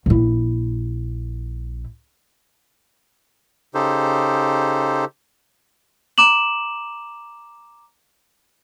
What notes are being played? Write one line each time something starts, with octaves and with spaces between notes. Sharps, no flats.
A#1 E4
C#3 D#4 G4 A4 C5
A#5 D6 E7 F#7